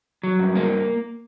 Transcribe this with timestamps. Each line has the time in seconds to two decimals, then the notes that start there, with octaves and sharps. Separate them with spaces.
0.23 F#3
0.39 G2
0.55 A#3